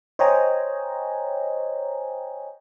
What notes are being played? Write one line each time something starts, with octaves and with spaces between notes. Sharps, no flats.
C5 C#5 D#5 G5 G#5 A#5